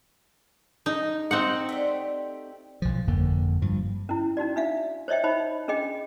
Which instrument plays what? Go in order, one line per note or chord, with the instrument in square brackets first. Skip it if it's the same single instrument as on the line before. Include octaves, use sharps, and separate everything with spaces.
[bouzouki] G#3 [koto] D#4
[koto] C4 D#4 F#5
[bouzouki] A3 G4 D5
[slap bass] B1 F3
G1 F2 D3 A#3
G2 F3
[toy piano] C#4 E4
C#4 D#4 F#4 D5
D4 E5 F5
C5 C#5 D#5 E5 G5
D#4 C5 D#5 B5
C#4 D4 G#4 D#5 G5